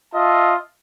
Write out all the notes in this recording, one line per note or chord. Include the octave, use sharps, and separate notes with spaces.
F4 D#5 E5 A5